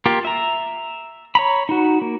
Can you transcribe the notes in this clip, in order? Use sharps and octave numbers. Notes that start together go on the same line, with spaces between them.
A#3 F4 G4
E5 A#5
C#5 A#5 B5
D#4 F#4
A#3